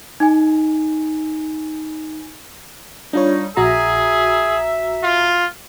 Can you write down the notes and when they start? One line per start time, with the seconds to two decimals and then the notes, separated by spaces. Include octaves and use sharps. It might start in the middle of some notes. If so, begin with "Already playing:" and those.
0.20 D#4 G#5
3.13 G3 D4 D#4 F4 C#5
3.57 A#1 F#4 G#4 E5 A#5
5.03 F4